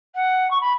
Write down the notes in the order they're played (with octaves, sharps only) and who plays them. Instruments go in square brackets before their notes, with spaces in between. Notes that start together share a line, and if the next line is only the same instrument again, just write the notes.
[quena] F#5
C#6
B5